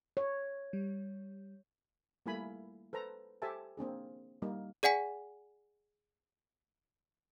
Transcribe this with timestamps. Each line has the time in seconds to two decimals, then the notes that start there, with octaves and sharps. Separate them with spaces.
0.17 C#5
0.73 G3
2.26 G3 A3 A#3 E4 G#5 B5
2.93 A4 B4 C5 A#5
3.42 G4 A4 C5 E5 G#5 A5
3.77 A#3 C4 D4 G#4
4.42 G3 A#3 D#4
4.83 G#4 D5 F#5 G#5 B6